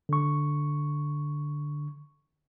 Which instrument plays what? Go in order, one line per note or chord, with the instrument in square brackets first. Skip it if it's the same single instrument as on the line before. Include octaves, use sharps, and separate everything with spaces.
[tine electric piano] D3 C#6